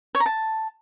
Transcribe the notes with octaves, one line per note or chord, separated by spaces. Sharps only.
C#5
A#5
A5